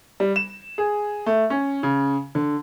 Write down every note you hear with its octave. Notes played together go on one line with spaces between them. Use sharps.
G3
E7
G#4
A3
C#4
C#3
D3